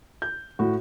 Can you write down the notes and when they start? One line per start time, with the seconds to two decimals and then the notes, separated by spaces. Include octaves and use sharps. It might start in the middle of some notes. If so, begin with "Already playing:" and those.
0.22 G6
0.59 A2 F#4